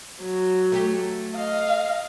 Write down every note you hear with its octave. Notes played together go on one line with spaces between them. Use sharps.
F#3
A3 G4
D#5 F5